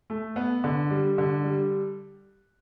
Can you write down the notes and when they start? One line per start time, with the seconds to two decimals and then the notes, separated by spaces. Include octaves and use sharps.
0.10 A3
0.36 B3
0.64 D3
0.90 G3
1.18 D3
1.44 G3